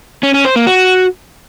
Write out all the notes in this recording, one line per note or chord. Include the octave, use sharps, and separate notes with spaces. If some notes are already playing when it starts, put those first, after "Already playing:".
C#4
C#4
C5
A#3
F#4